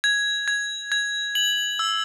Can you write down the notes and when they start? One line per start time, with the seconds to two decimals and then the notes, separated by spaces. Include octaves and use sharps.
0.04 G#6
0.48 G#6
0.92 G#6
1.35 F#7
1.79 E6